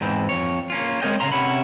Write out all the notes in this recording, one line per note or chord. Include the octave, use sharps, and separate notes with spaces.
E2 G#2 E3 C4
F2 C#5
A#3 C#4 F4
G#3 C4 A#4 C#5 D#5 G5
C#3 F#3 D#5 F5 A#5 C6
C3 C#4 E4 F#5 B5